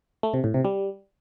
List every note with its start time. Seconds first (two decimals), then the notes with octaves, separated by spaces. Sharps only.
0.23 A3
0.34 C3
0.44 A2
0.54 C3
0.65 G3